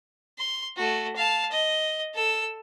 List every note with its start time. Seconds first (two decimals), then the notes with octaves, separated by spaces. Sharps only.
0.38 C6
0.77 A3 F#4
1.16 F5 A5
1.51 D#5
2.14 A4 E6